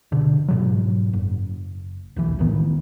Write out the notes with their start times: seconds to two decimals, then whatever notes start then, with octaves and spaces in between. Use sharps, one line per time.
0.12 B2 D3
0.48 G#2 B2 F#3
1.13 F#1
2.16 E1 B1 E3
2.39 C#2 A2 D#3 B3